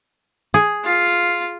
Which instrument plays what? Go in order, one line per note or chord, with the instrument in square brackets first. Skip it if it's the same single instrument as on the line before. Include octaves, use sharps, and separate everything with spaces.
[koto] G#4
[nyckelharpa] F4